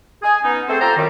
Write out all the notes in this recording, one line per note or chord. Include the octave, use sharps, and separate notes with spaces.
G#4 G#5
B3 C#4 D#4
A3 B3 C4 G#4 A4 C5
F4 G4 A4 C5 D5 A#5
F#2 D#3 G3